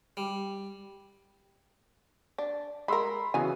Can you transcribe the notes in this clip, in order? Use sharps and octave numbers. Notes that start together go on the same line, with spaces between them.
G3
D4
G#3 A#4 B5 C6 E6
C#3 E3 B3 F#4 G#5